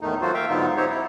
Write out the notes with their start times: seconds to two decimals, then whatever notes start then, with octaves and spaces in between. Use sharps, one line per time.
0.01 E2 A2 D#3 A3 D#4
0.22 F#3 A3 F4 F#4 C5
0.34 A#3 E5 F5 G5
0.49 G#2 D3 F#3 B3 D#4 F4
0.77 C4 D#4 G4 C5 C#5
0.90 E4